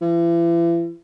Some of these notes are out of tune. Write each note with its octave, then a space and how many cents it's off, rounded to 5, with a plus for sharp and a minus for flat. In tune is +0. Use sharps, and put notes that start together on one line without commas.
E3 +40